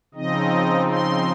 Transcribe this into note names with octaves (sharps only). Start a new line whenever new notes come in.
C#3 F3 C4 D#4 D#5
C6